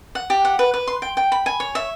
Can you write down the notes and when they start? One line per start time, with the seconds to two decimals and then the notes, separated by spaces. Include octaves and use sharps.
0.15 F#5
0.30 G4
0.45 F#5
0.59 B4
0.74 B4
0.88 C6
1.02 G5
1.17 G5
1.32 B5
1.46 G#5
1.60 C#5
1.75 E5